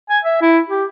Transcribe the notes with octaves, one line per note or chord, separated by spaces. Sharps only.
G#5
E5
E4
G4